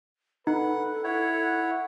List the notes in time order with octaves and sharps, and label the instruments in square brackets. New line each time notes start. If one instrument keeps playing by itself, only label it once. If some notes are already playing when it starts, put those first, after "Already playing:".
[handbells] D#4 [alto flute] A4 [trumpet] B4 [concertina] F#5
[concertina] E4 C#5 [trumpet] F#5